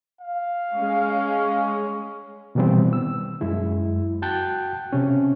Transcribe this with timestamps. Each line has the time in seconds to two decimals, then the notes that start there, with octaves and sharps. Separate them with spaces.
0.21 F5
0.74 G#3 C#4
2.55 B2 D#3 E3 G3 B3 C4
2.93 E6
3.41 F#2 G#3 E4
4.22 F#4 G5 A5 F#6 G6
4.93 C3 C#4